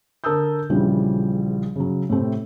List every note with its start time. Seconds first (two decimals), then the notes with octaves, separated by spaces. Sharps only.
0.24 D3 A#4 A5 D#6 E6 G6
0.70 A#1 C#3 E3 F3 G3
1.76 C#3 F#3
2.09 A2 C3 A3 C4